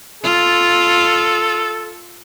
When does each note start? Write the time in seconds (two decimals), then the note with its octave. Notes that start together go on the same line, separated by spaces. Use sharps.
0.24 F4 A4